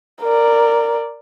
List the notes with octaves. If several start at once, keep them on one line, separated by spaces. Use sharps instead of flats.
A#4 D5